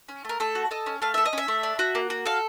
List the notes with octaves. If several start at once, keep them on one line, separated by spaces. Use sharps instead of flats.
C#4
A3 A#4
A3 A4
F#4
A4 D#5
C#4
A3 F5
A4 E5
D#5
C#4 E5
A3
D4
F#4
A#3
F#4
A4 F5